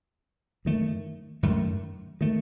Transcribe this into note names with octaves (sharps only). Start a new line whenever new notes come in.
F#2 D#3 A3
F#2 D#3 A3
D#3 A3